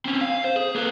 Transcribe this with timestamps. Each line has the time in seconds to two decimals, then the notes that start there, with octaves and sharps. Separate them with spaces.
0.05 C4 C#4
0.21 F5
0.44 C5
0.56 G#4
0.75 A#3 B4